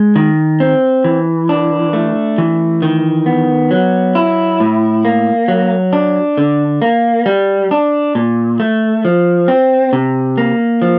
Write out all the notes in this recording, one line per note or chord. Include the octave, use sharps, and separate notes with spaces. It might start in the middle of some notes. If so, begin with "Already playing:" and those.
Already playing: G#3
D#3
C4
E3
D4
A3
E3
D#3
B3
F#3
E4
A2
A#3
F#3
D4
D3
A#3
G3
D4
A#2
A3
F3
C4
C3
A#3
F3